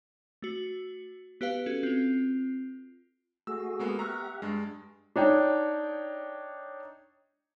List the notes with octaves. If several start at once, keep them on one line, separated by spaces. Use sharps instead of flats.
A3 F#4
B3 G4 B4 F5
C#4 F#4 A4
C4 F4
A3 F#4 G#4 E6
G#3 A#3 B3
G4 E5 F#5 A#5 C#6 F6
G2 G#3
D4 D#4 C#5 G5